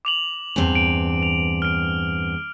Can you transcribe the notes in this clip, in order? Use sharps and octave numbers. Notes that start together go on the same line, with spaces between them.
D6 F7 F#7
E2 G2 C4
D7
F7
F6 D7